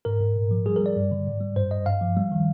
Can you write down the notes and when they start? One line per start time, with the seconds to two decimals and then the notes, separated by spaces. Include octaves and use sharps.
0.05 G#2 A#4
0.21 G#2
0.36 A#2
0.51 F3
0.66 G3 G#4
0.76 A#4
0.81 G3
0.86 D5
0.96 G2
1.11 D3
1.27 G#2
1.41 G3
1.56 G2 C5
1.71 G2 D#5
1.86 G2 F5
2.01 F3
2.17 G3
2.32 D#3